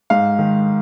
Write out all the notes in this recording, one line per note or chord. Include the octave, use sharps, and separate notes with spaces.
G#2 F5
D#3